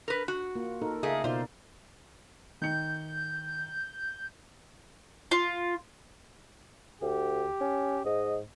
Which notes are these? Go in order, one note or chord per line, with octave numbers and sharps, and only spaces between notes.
A#4 B4
F#4
A#3 F4
D#4 A4 A#4
C#3 A3 G#4 A#4 D#5 F5
B2 D#4 F4 C5 D5
D#3 G6 C#7
F4
D2 G4
C#4
G#2 D#5